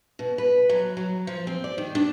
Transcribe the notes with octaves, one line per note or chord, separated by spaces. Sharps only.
B2
B4
F#3
F#3
F3
C4
D5
D#3
D4